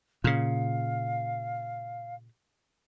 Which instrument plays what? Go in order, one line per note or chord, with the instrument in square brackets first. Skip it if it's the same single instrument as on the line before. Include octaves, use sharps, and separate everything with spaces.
[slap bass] A#2 C#3 [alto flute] F5